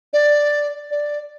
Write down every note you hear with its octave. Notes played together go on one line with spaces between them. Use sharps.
D5
D5